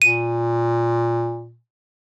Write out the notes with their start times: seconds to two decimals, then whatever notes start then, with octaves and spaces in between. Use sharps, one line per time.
0.02 A#2 D#7